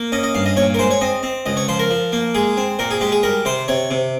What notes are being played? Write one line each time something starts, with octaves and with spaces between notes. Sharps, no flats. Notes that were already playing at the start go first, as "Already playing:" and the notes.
Already playing: A#3
C#4 D#5
D#5
G2 F5
D#5
A#2 C#5
A#4
G#3 C5
C#5
C4 D#5
C4
C#2 D#5
C#5
F3 C5
A#4
F3
A#3
G#3 G#4
C4
A#2 A#4
G#4
G#3 G4
G#4
G3 A#4
C3 C5
C3 C#5
C3